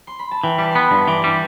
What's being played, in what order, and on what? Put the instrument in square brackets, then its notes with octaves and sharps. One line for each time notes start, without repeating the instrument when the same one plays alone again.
[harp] C6
B5
A5
[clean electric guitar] E3 [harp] G5
[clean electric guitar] G3 [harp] A5
[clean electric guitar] B3 [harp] B5 C6
[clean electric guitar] G2 [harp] C6
[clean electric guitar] E3 [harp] D6
[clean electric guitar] G3